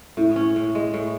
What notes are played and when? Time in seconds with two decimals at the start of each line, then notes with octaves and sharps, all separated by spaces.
0.17 A2 E4
0.36 C#4
0.56 A2
0.75 G#3
0.94 A2